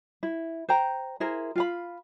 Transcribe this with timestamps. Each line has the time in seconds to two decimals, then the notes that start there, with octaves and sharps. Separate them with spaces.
0.23 E4
0.69 C5 G5 A#5
1.20 E4 G#4 A#4 C5
1.56 F4 F5 B5